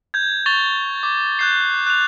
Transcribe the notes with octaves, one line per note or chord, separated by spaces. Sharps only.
G6 G#6
C#6 A6 F7 G7
D6
F#6 G6 C7
F#6 F7